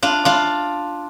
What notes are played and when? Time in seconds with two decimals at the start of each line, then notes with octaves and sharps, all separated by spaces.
0.03 D4 F4
0.25 D4 F4